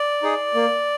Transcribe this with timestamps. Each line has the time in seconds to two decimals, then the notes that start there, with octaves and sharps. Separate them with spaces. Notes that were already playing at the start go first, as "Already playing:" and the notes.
Already playing: D5
0.23 D#4 G#4
0.55 A#3